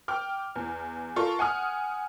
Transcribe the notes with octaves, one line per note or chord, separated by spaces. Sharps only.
G5 D6 F6
E2
F4 A4 A#4 C#6
F#5 G#5 D#6 F6